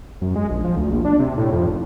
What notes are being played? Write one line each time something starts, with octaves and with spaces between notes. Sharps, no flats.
F#2
G#3
A#1
F3
D2
A#1
D4
C3
A2
F2
F1